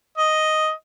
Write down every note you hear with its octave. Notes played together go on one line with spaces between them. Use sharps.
D#5